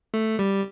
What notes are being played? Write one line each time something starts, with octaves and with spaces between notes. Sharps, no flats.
A3
G3